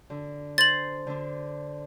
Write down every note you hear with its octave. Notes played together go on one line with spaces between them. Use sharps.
D3
C5 A6 F#7
D3 D4